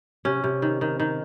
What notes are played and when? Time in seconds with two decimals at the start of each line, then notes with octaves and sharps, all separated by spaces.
0.25 C3 C#4
0.44 C3
0.62 D#3
0.81 D#3
1.00 D#3